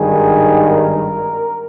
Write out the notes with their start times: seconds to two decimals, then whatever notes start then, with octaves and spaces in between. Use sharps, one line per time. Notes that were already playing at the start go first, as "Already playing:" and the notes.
Already playing: G#1 G2 D#3 G#4
0.69 A#4